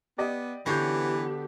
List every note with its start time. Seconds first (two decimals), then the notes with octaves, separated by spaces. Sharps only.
0.18 B3 G4 D5 D#5
0.66 D3 E3 B3 F#4 G4 C#5 G6 C7